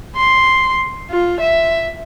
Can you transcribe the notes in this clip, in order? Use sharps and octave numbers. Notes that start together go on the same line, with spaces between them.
C6
F4
E5